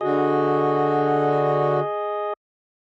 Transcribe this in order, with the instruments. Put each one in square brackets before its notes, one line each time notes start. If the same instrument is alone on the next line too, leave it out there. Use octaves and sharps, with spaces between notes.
[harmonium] D3 F#4 [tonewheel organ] G#4 D#5